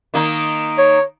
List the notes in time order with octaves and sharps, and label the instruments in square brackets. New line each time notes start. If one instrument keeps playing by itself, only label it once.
[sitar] D#3 A#3 D#4
[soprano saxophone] C#5